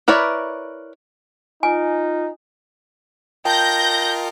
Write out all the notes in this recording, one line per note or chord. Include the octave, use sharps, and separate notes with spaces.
E4 A#4 B4 C#5 D5
D#4 F4 G#5
F4 A#4 D#5 G5 A5 G6 A#6